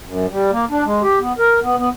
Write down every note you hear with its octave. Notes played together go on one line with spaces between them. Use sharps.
F#2
G3
A#3
D4
G#3
G4
B3
A#4
B3
B3